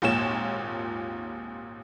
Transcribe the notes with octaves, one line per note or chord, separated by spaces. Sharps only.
G#1 D#2 A#2 F4 C#5 E7